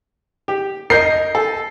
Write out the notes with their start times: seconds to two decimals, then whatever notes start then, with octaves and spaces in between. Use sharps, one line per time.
0.48 G4
0.90 A#4 D#5 G6 C7
1.35 A4